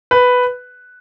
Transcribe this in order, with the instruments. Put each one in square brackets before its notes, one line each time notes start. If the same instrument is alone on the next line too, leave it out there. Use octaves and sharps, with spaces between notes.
[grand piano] B4